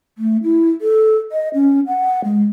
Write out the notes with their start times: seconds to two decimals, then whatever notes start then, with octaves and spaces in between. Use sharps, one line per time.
0.18 A3
0.43 E4
0.81 A4
1.32 D#5
1.54 C#4
1.87 F#5
2.24 G#3